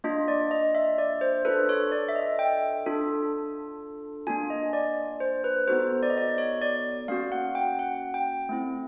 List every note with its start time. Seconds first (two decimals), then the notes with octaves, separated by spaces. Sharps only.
0.04 A#3 D4 F4 D#5
0.28 D5
0.51 D#5
0.75 E5
0.98 D5
1.21 C5
1.45 D4 F4 A4 B4
1.69 C#5
1.92 D5
2.08 E5
2.16 D#5
2.39 G5
2.86 D4 F4 A4
4.27 A#3 D4 F4 G#5
4.50 D#5
4.73 D5
5.20 C5
5.44 B4
5.67 B3 D#4 F#4 A4 C5
6.03 D5
6.10 D#5
6.18 D5
6.38 C#5
6.62 D5
7.08 A#3 C#4 F#4 F5
7.32 F#5
7.55 G5
7.79 F#5
8.14 G5
8.49 A3 C4 E4